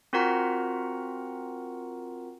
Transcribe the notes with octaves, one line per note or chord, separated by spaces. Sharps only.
C4 F4 F#4 A#4 F#5 A#5